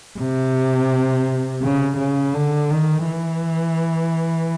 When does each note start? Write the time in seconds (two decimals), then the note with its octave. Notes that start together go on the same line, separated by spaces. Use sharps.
0.19 C3
1.63 C#3
1.98 C#3
2.34 D3
2.71 D#3
3.06 E3